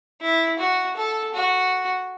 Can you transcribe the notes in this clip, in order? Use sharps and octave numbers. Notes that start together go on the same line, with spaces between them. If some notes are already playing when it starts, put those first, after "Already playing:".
E4
F#4
A4
F#4